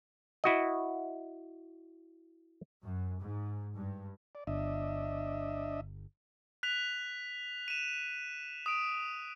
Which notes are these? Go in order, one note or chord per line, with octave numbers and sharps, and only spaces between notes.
E4 F#4 D#5
F#2
G#2
G2
D5
G1 D4 D#5 E5
F#6 B6 F7
D#7 E7
D#6 D7